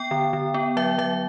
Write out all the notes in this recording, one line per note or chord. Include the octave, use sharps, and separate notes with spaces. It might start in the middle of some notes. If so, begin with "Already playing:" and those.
Already playing: B3 G5
D3
D3
B3
F#3 E5
F#3 E5